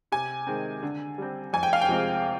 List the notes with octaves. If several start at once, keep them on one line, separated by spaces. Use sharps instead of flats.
C3 G#5
D#3 G#3 C4
D3
G3 C4
F2 G#5
G5
F5
G5
C3 F3 G#3 C4